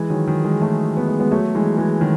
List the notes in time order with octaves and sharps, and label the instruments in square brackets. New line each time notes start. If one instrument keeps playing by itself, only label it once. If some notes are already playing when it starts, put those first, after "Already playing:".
Already playing: [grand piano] E3 G#3
D#3 F#3
D#3 F#3
E3 G#3
F#3 A3
B3
A3
G#3 B3
F#3 A3
E3 G#3
E3 G#3
D#3 F#3